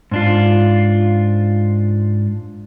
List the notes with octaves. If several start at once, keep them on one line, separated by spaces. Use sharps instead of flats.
G#2 D4 F4